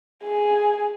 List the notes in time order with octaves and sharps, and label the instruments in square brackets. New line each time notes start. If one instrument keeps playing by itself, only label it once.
[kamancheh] G#4